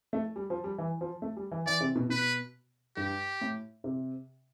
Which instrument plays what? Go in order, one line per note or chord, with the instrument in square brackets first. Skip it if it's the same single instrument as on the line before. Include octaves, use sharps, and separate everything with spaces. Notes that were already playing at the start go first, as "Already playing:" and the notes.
[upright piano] A3
G3
F3
G3
E3
F3
A3
G3
E3
[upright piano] E3 [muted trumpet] D5
[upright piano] C3
B2
[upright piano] B2 [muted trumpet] B4
[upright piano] G2 [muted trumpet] G4
[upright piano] A2
C3